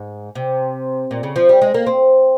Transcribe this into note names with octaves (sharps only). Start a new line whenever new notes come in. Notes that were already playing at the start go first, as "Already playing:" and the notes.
Already playing: G#2
C3
A#2
C#3
F3
G3
G#3
A#3
C4